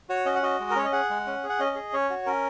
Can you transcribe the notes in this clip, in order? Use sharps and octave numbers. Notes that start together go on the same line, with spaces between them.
F#4 C#5
C#4 D#5
F#5
F#4 D#5
G#3
A#4
C#4 C#5
D#5
G#4 F#5
G#3
C#4
G#4
F#5
C#4 D#5
G#4
C#4 C#5
F#4
C#4 A#4